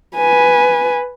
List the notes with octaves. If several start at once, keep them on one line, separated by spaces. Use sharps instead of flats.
B4 G#5